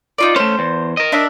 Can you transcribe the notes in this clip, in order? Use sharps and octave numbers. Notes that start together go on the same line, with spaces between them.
D#4 F4 D5
A3 C#4 C5
E2
A#4 D#5
D4 E5